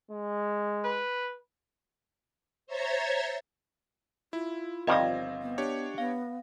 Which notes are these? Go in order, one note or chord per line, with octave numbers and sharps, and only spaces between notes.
G#3
B4
C5 C#5 E5 A#5 G#6 A6
E4 F4
G1 D#3 F3 G3 C4 D#5 F5
B3
D4 G4 C#5
B3 F5